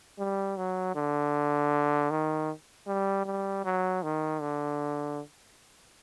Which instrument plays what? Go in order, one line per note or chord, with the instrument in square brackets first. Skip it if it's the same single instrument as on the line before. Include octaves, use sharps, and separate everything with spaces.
[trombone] G3
F#3
D3
D#3
G3
G3
F#3
D#3
D3